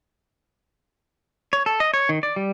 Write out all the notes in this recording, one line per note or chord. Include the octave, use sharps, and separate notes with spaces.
C#5
A4
D#5
C#5
D#3
D5
G3